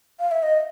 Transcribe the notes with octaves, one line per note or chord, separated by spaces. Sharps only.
F5
E5
D#5